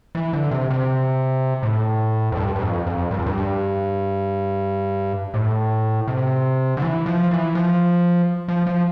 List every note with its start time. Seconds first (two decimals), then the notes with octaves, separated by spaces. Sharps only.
0.15 E3
0.33 D3
0.51 C3
0.70 C3
1.63 A2
2.32 F2
2.37 G2
2.56 G2
2.62 F2
2.86 F2
3.11 G2
3.19 F2
3.26 G2
5.34 A2
6.08 C3
6.77 D3
6.82 E3
7.06 F3
7.31 E3
7.55 F3
8.48 F3
8.67 F3